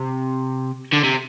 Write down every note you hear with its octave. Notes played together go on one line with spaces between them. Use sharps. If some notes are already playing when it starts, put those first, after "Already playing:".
Already playing: C3
D3
C3